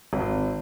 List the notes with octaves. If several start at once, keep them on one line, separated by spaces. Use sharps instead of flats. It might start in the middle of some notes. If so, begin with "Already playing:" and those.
G#1